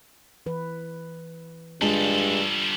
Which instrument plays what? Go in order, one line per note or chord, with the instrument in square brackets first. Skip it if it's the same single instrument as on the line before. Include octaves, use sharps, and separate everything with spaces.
[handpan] E3 B4
[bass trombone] G2 [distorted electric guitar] G3 A4 [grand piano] G#3 [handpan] D4 F4